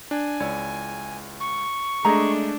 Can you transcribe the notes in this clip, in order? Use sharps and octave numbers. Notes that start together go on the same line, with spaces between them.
D4 G#5
C#2 E4 C#5 D5
C#6
G#3 A3 D4 G#4 D#5 A#5